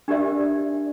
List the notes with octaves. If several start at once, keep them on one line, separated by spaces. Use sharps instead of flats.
D4 G4 A#4 D5 E5